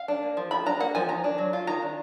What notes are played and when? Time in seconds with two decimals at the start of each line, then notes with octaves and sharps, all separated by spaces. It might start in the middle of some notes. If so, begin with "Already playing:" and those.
Already playing: F5
0.08 D4
0.23 A#3
0.37 F3
0.51 F3 B5
0.66 D4 A#5
0.80 A#3 F#5
0.95 F3 G#5
1.09 D#3 A#5
1.24 D4
1.38 F#3
1.53 F4
1.67 D#3 A#5
1.82 D4